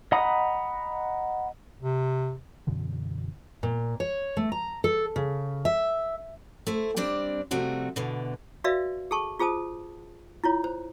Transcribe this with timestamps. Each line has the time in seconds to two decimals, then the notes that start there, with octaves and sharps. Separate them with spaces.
0.12 D#5 F#5 A#5 B5 D#6
1.82 C3
2.67 F#2 B2 D3 E3
3.63 A#2
4.00 C#5
4.37 A3
4.52 A#5
4.84 A4
5.16 C#3
5.65 E5
6.67 A3 E4 C5
6.97 G3 C4 D4 D5
7.51 C3 F3 G3 A3 C4 F#4
7.96 B2 D3 E3
8.64 F#4 B4 D5 E5 F5
9.11 G#4 A4 A5 C#6
9.39 F4 G#4 C5 A5 D#6
10.44 E4 F4 C#5
10.64 C5